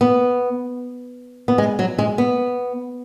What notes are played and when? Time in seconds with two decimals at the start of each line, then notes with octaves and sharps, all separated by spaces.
0.01 B3
1.48 B3
1.58 G#3
1.79 F#3
1.99 G#3
2.18 B3